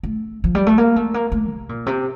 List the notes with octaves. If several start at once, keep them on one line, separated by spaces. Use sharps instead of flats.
A3
F3
G3
A3
A#3
A3
A#3
A3
C3
A#2
C3